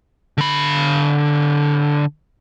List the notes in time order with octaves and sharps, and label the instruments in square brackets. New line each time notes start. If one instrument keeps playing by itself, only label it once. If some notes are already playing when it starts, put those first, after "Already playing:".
[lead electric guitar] D3 B5